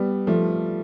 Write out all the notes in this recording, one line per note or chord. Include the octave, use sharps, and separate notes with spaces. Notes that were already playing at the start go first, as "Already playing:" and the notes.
Already playing: G3 B3
F3 A3